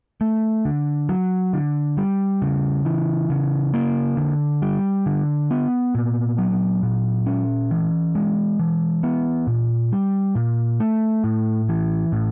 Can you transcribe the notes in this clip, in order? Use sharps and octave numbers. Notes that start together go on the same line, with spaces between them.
A3
D3
F#3
D3
G3
C#3
E3
C#3
A#3
D3
G3
D3
B3
A#2
F#3
A#2
C#4
E3
G#3
E3
B3
A#2
G3
A#2
A3
A2
E3
A2